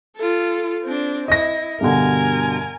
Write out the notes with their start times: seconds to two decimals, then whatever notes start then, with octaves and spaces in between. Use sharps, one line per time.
0.16 F4 A4
0.84 C4 D4
1.28 E4 D#5 A#6
1.81 G2 B2 D3 A#4 G#5